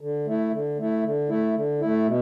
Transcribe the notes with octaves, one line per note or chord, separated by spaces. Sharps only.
D3
A3 E4
D3
A3 E4
D3
A3 E4
D3
A3 E4
B2